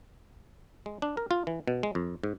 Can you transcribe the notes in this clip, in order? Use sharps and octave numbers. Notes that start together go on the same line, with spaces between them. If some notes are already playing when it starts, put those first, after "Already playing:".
G#3
D4
A#4
F4
E3
B2
G#3
F2
G#2